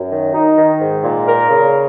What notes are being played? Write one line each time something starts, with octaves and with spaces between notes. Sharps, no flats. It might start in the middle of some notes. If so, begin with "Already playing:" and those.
Already playing: F#2
D#3
D#4
D#3
G#2
A#2
A#4
C#3